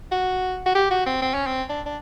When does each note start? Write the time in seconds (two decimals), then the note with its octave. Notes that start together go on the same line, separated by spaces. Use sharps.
0.11 F#4
0.66 F#4
0.75 G4
0.91 F#4
1.06 C4
1.22 C4
1.34 C#4
1.46 C4
1.69 D4
1.86 D4